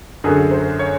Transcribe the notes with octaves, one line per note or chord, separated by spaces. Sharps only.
F#2 D3 F#3 G#4
C5
C#5